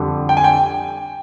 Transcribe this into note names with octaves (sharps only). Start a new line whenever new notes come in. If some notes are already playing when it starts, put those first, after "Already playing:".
Already playing: F2 D3 G3
G5
G#5
G5